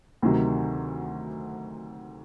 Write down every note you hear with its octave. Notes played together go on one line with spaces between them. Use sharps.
D2 C3 D#3 F#3